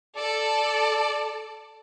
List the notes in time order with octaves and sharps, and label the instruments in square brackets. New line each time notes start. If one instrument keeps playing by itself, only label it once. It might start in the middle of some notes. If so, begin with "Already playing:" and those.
[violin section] A4 [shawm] D5